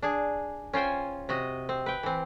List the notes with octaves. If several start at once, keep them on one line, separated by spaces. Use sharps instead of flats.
D4 G#4
C#4 F4 C5 G5 G#5
C3 F#4 D#5
C4
B4 G5
E3 C4